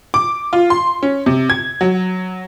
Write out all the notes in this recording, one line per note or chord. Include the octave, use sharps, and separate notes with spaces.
D6
F4
C6
C#4
C3
G#6
F#3